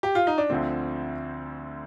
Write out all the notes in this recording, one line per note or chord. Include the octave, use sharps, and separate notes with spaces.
G4
F4
D#4
D4
D2 D3 F3 C4